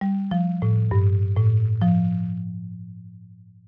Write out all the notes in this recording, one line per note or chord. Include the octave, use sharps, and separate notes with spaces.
G3
F3
A2
G2
A2
F3